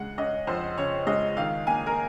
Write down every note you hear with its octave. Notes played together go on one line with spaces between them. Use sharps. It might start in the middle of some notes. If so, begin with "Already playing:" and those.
Already playing: C#3 G#3 F#5
C#4 D#5
F2 C5
C#3 C#5
G#3 D#5
D#3 F5
A#3 G#5
A#4